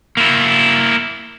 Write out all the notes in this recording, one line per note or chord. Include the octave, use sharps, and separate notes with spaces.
A#3 E4